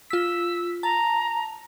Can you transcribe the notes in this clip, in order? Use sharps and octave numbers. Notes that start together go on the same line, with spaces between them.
F4 E6 B6
A5 A#5